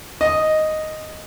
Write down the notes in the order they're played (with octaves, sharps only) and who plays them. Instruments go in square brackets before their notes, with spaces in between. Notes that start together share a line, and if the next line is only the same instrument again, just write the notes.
[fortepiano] D#5